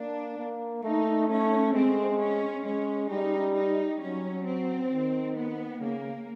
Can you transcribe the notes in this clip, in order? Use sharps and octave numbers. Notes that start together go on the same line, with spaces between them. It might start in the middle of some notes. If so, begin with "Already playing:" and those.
Already playing: A#3 D4
A#3
A3 D#4
A3 C#4
G#3 C4
C#4
G#3 C#4
G3 D#4
D#4
F#3 C#4
C4
D#3
B3
C#3 A#3